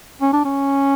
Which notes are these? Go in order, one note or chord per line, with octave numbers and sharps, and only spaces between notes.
C#4
D4
C#4